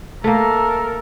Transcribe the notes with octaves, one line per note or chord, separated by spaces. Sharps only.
A3 A#3 A4 A#4